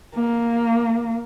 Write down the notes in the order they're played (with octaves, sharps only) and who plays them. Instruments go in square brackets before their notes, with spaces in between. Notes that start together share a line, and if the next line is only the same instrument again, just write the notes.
[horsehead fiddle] A#3